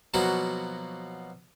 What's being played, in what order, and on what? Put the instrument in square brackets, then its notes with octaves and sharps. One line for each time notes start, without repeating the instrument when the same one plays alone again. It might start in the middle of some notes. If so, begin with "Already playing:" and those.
[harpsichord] B2 F3 F#3 A#3 F#4